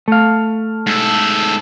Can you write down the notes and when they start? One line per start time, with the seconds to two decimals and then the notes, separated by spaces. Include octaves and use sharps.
0.08 A3 F5
0.87 G#2 A4